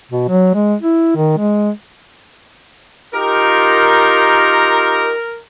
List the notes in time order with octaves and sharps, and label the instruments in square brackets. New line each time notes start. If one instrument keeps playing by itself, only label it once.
[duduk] B2
F#3
G#3
E4
D#3
G#3
[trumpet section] D#4 F4 G4 [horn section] A#4